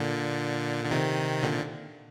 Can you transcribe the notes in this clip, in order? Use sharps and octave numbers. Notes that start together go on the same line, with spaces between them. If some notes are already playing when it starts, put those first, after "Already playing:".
Already playing: A#2 D3
D3
C3 D#3
A#2 D3